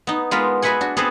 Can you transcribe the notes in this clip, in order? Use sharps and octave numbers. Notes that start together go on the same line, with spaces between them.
B3 D#4
G#3 B3 F4 A#4 B4
F#4 G#4 B4 E5 F#5 G#5
D4 F#4
B3 C4 G#4 A4 B4 C5